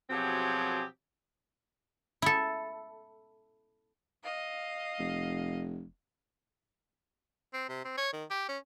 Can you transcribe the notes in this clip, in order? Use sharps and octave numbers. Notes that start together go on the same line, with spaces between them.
B2 F3 F#3 C4 G4 G#4
E4 A4
D#5 F5
F1
C4
C3
C4
C#5
D#3
G4
C#4